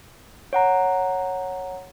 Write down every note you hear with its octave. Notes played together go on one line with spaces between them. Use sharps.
C#5 F#5 A#5